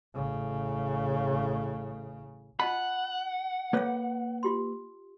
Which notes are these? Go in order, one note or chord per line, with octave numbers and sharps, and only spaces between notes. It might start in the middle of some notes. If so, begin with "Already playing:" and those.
A1 C#3
F4 D#5 F#5 A5 B5
A#3 A4 B4 C#5 F5
F4 G4 C6